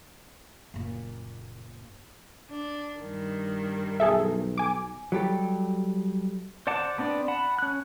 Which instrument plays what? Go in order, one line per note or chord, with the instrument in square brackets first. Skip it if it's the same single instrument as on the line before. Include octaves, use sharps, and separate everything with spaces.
[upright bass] F#1 A#2
[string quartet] D4
G2 D#3
[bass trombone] B1 [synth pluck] G#4 A4 E5
[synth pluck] G#5 D6
[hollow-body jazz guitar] F#3 G3 G4 A4
[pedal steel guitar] C5 D5 F#5 A5 D6
B3 C4 D4 D5
F#5 A5 B5
C#4 F#6